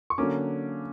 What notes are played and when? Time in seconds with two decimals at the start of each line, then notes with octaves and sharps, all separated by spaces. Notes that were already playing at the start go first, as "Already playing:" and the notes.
0.10 C#6
0.18 D3 F#3 A#3 C#4 D6